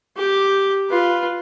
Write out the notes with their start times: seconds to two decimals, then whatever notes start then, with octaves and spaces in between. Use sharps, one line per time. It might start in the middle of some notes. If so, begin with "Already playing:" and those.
0.16 G4 D6
0.89 F4 B4